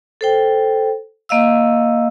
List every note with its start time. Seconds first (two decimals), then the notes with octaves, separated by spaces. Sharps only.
0.21 A4 C5 G5
1.29 A#3 D#5 F5 E6